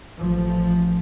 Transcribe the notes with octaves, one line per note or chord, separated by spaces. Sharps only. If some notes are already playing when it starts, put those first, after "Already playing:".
A1 F3